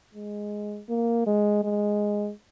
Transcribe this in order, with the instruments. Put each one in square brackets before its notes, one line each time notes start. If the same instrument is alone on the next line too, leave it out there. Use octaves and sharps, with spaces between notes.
[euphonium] G#3
A#3
G#3
G#3